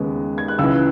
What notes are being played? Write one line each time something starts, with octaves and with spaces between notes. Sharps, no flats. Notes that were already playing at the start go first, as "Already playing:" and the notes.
Already playing: D#2 C#3 G#3 B3
G#6
F#6
C#2 C#3 E3 E6